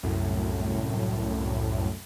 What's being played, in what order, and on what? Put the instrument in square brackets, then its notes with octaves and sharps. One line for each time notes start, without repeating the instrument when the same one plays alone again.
[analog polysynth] C2 F#2 A2